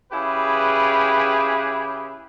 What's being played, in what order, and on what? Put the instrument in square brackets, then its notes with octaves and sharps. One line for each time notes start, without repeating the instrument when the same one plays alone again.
[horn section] C#3 E4 G4 G#4 B4